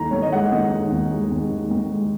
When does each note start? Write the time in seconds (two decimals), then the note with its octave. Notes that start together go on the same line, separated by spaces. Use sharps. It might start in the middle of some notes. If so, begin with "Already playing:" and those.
Already playing: D#2 D#3 A#5
0.11 D#2 C#5
0.22 D#5
0.32 G#3 F#5
0.52 D#2 D#4
0.72 D#3
0.92 D#2
1.11 G#3
1.31 D#2
1.51 D#3
1.71 D#2
1.91 G#3